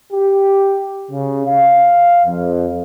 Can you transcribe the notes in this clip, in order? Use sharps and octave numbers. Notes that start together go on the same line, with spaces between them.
G4
C#3
F5
F2